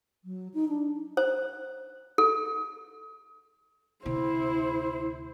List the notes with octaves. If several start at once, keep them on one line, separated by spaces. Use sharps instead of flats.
F#3
D#4
D4
C5
A4
D2 C3 E4 C5